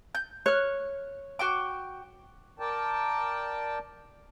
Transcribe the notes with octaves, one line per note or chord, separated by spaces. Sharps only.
G6
C#5 F6 F#6
F#4 G5 D6
A#4 D5 G5 A5